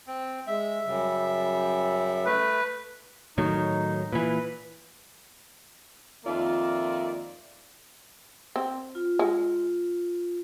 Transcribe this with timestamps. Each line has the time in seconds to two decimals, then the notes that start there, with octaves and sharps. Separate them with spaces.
0.07 C4
0.47 G#3 E5
0.85 F#2 C#3 G3
2.26 A3 B4
3.38 A2 D#3 F#3 D#4
4.13 A#2 E3 B4
6.25 F2 D#3 A#3 F4 D5 E5
8.56 C4
8.95 F4
9.19 G#3